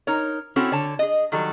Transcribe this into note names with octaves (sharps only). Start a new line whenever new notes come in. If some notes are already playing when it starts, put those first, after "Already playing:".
D#4 A#4 C#5
C4 C#4 E4 F#4 A4 C#5
D3 C#5 A5
G#4 D#5
D#3 F#3 G3 A4